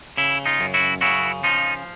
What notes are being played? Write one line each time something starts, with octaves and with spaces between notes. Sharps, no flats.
C#3 E4
D#4 F4
F#2
E4 F#4
C#3 E4 F#4
F3 D#4 F4